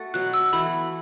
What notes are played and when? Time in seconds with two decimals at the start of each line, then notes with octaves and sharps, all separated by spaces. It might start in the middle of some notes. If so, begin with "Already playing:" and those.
Already playing: A3 F#4 A4
0.14 B2 F#3 B3 F#6
0.34 E6
0.53 E3 A3 F#4 B5